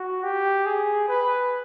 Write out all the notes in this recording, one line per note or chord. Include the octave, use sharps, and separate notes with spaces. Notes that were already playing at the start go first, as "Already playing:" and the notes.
Already playing: F#4
G4
G#4
B4